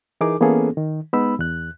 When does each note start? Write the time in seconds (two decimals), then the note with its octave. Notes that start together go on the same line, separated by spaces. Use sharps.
0.21 E3 D#4 G#4 A#4 D6
0.40 E3 A#3 B3 C#4 G#4 A4
0.77 D#3
1.13 G#3 B3 D#4 B5 E6
1.39 E2 F#6